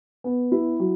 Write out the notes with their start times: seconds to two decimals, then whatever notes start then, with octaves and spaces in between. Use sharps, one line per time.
0.24 B3
0.52 E4
0.80 F#3